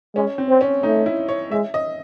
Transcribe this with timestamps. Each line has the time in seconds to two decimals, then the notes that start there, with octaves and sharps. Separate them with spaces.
0.15 G#3 C#4
0.38 C4
0.49 C4
0.61 C#4
0.83 A3 D#4
1.06 E4
1.28 C#5
1.51 G#3 E5
1.74 D#5